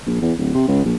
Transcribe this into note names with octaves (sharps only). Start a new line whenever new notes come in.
A#1
E2
D1
C3
C#2
A#1